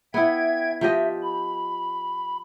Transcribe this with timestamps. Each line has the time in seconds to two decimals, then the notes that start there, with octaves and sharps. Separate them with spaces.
0.14 B3 E4 E5 G5 G#6
0.81 F3 G4 D#5 E5
1.23 B5